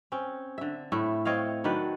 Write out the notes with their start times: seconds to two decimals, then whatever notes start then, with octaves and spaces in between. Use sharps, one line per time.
0.12 C4 C#4
0.58 D3 E5
0.92 A2 A3 E4
1.25 C4 C#5 D#5 F5
1.64 D#3 F#3 D4 B4